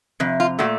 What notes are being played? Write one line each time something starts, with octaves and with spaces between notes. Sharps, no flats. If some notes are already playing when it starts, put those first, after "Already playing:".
F2 C3
F4
A#2 A3 F#4